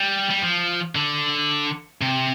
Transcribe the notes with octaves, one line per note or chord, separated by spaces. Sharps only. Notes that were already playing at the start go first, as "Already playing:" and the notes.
Already playing: G3
G3
F3
D3
C3